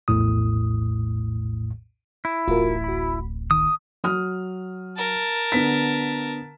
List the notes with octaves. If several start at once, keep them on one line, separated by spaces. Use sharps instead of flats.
A#1 E2 A2 D#6
E4
D1 A1 F4 F#4 A#4
F#4 B5
D#3 D#6
F#3 D#6 F6
A#4 A5
D3 B3 B6